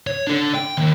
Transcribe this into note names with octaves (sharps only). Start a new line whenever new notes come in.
C#5
D4 A4
G5
D#2